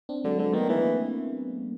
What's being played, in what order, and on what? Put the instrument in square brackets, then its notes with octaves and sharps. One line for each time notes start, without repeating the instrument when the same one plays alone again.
[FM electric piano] C4 D4
[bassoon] D3 [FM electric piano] F#3 G#3
[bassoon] D3 [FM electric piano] F#3 G#3
[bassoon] D#3 [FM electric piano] A3 B3
[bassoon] E3 [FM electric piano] G#3 A#3